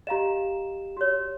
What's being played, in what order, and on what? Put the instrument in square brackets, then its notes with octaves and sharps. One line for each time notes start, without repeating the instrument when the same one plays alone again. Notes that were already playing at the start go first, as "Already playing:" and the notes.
[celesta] G4 E7 [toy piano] D#5 F5 A#5
[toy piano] F#4 C#5